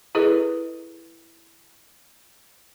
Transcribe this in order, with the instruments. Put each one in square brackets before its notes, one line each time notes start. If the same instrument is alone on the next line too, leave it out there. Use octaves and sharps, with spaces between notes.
[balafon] E4 G#4 A4 B4 D#5